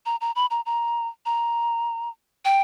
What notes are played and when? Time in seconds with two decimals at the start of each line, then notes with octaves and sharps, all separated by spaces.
0.06 A#5
0.21 A#5
0.36 B5
0.51 A#5
0.66 A#5
1.26 A#5
2.45 G5